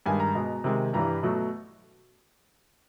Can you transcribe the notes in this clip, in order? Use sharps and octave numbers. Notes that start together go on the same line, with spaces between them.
G2 D#3 G#3 G#5
A#5
B2 G#3
C3 D#3 G#3
G2 E3 G3 A#5
B2 F#3 A3